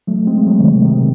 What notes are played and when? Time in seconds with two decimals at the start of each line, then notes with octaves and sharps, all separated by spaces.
0.07 F#3 A3
0.27 G#3 C4
0.46 F#3 A3
0.60 C3 D#3
0.85 C3 D#3